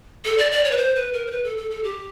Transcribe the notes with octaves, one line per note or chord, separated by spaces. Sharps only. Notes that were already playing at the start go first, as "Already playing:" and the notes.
A4
D5
D5
C#5
B4
C5
B4
A#4
C5
B4
A4
A4
A4
G4